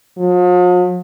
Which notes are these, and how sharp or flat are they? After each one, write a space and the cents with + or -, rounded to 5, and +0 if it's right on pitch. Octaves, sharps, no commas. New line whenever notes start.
F3 +45